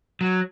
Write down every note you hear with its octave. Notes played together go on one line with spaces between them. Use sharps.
F#3